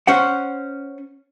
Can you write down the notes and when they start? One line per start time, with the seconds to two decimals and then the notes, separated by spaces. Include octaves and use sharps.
0.07 C#4 C5 F#5